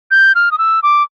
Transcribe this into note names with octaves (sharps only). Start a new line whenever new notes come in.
G6
F6
D#6
E6
D6